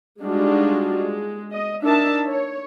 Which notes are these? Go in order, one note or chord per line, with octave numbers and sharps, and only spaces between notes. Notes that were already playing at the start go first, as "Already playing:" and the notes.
G3 G#3 D4 D#4 F4 F#4
G#3
D#5
D4 D#4 A#4 E5 A5
C#5